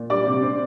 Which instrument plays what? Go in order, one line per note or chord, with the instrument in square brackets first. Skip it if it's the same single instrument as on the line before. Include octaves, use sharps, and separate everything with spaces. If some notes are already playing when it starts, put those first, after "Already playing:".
Already playing: [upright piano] A#2
G3 D5 D6
C3
C4